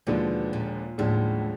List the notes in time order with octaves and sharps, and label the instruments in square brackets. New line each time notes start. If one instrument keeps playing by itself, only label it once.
[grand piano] D#2 D3 F3 G#3 [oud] B2
[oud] A#2
[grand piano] D#2 D3 F3 G#3 [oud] A2